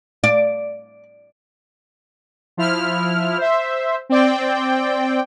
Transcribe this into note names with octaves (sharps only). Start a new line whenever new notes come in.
D5
F3 E4 F6
C5 E5
C4 D5 G5